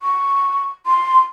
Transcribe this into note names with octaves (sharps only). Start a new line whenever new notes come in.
C#6
C6